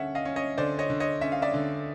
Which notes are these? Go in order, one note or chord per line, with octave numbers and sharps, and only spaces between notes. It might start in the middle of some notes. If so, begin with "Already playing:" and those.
Already playing: D3 C#4 E5 F#5
D#5 F5
C#4
C#5 D#5
D3 C5 D5
C#5 D#5
D3
C#5 D#5
C#4 E5
F5
D5 E5
D3